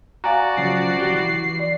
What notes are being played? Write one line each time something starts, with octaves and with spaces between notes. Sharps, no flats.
F#4 D5 F5 G#5 A#5
C#3 F3 F#3 C7
F#3 G4
E3
D5